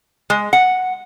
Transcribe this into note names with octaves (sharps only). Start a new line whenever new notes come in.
G#3
F#5